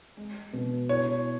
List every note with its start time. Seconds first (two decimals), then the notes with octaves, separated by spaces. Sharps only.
0.17 G#3
0.53 B2
0.89 E4 C#5